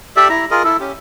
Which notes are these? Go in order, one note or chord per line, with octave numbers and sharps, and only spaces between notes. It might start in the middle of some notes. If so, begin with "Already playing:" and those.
G4 A4 D5 E5
E4 A#5
F4 G#4 A#4 D#5
E4 A4
C#4 G4